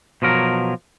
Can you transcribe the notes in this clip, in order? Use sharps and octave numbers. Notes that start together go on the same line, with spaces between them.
B2 F3 F#3 A#4